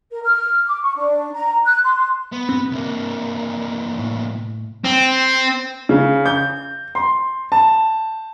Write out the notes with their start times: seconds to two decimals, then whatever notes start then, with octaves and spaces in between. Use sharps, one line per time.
0.12 A#4
0.24 F6
0.66 D6
0.83 C#6
0.96 D4
1.34 A#5
1.65 F#6
1.84 C6
2.32 B3
2.49 G2 C4
2.71 C2 A#3
3.99 A2
4.85 C4
5.89 C#3
6.26 G6
6.95 C6
7.52 A5